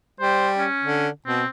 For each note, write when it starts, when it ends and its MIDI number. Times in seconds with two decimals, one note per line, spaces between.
0.20 0.65 55
0.20 0.49 72
0.58 1.07 61
0.83 1.09 50
1.26 1.43 47
1.26 1.47 60